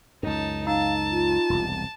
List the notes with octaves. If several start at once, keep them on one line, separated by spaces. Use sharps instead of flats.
C#2 F#2 D#4 A5
D#4 F5 A5
F4
E1 C2